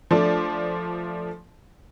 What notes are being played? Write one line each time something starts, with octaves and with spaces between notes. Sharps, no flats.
F3 A3 D4 D5